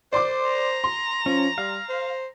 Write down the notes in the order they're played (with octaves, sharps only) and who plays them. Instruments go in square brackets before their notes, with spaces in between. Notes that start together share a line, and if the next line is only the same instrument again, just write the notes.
[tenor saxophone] C5 [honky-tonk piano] D5 C6 D6
[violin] A#5
[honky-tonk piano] C6
[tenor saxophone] F3 [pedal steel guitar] C#4
[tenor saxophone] G3 [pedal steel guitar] F5
[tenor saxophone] C5